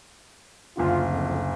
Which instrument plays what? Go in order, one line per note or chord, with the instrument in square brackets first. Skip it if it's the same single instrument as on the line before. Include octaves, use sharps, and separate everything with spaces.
[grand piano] F#1 D2 D3 [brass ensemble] F4
[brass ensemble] F2